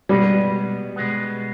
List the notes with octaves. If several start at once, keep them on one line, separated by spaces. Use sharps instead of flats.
B2 G3 G#3 B3
B2 G#3 B3